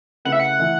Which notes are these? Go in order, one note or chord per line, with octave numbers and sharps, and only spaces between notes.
C#3 A3 E4 B4 F#5
E5
F#5
E3 A3 E4